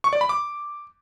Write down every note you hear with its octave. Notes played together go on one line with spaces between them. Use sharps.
C#6
D5
B5
D6